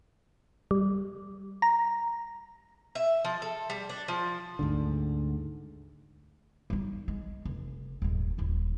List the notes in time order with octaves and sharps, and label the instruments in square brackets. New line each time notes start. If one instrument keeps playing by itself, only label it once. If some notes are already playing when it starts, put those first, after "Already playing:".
[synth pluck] G3
A#5
[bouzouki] E5
F3
A4
G3
D4
F3
[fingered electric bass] D2 G#2 D3
[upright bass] G3 D#4
G#3
F1
D#1 G#1
D#1 E4